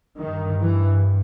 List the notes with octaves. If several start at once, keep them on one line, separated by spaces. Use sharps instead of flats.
G2 D#3
E3